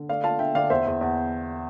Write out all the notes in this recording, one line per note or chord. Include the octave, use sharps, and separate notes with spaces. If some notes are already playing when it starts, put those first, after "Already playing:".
Already playing: D3
A3 D5 F5
F4 F5 A5
D4 E5 G5
D3 D5 F5
E2 C5 E5
E2
E2